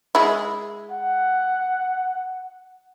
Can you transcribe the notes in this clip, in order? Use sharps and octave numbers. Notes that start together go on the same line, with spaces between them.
G#3 E4
F#5